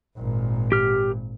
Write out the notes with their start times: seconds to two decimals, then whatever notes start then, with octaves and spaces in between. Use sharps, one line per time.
0.17 G#1 A#2
0.72 G4 F6